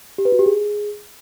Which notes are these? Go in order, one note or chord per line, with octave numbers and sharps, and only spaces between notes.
G4
B4
F#4
G4
G#4